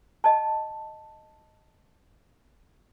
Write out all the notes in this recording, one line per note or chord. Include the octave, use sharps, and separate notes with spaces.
D#5 A5